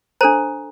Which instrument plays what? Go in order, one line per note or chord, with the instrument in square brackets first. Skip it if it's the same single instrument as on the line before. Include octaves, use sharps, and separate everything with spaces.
[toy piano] D4 A4 C5 A#5